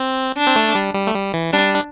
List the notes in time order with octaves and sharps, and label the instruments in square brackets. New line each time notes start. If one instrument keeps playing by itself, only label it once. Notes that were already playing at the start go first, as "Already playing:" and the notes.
Already playing: [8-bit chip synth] C4
[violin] D4
[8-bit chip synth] C4
A3
G3
G3
A3
G3
E3
[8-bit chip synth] G3 [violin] D4
[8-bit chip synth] D4